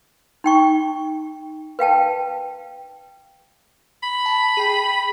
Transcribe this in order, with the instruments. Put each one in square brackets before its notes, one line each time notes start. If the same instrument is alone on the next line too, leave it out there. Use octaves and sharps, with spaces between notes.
[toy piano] D#4 G5 C#6
B4 F5 G5 A5
[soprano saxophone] B5
[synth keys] A5
G#4 G5